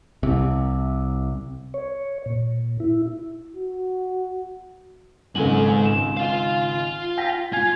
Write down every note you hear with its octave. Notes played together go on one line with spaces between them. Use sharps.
C2 C3
C#5
A#2
E4
F#4
G#1 C#2 G#2 A4 G#5 F#7
E7
F4 F5
G5 A#6 B6
F4 G#5 G#6